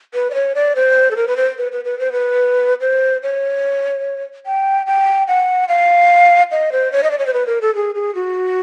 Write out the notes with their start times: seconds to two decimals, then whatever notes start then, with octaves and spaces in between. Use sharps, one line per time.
0.14 B4
0.30 D5
0.34 C#5
0.55 D5
0.76 C5
1.11 A4
1.16 A#4
1.28 B4
1.37 C5
1.58 B4
1.72 B4
1.85 B4
1.99 C5
2.12 B4
2.81 C5
3.23 C#5
4.46 G5
4.86 G5
5.28 F#5
5.69 F5
6.51 D#5
6.72 C5
6.92 C#5
7.03 D#5
7.11 D5
7.19 C#5
7.26 C5
7.33 B4
7.47 A#4
7.61 A4
7.75 G#4
7.95 G#4
8.15 F#4